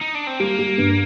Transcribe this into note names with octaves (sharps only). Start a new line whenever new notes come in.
D#4
D4
C4
G3 A#3
G3
G2